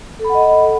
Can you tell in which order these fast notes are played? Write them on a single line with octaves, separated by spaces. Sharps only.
A4 B5 F#5 D#5